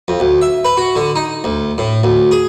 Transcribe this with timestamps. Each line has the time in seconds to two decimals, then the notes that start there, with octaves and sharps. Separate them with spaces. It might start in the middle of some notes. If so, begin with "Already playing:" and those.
0.08 F2
0.20 D2
0.42 E5
0.65 B4
0.77 F#4
0.96 D3
1.16 D#4
1.44 D2
1.78 A2
2.04 D2
2.31 G#4